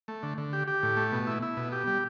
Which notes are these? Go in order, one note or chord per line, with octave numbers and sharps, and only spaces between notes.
A3
D3
D3
G4
G4
A2
A3
B2
E4
E4
B2
G4
G3